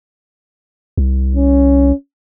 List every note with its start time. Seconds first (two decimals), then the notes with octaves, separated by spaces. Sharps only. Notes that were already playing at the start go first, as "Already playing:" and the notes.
0.97 C2
1.35 C#4